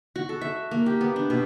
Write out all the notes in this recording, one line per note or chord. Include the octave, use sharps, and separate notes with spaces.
F#4
A4
E5
A#3
G4
B3
D4
B2